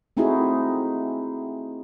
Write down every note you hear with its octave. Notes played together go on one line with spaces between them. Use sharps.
A3 C4 D#4 E4 F#4 G#4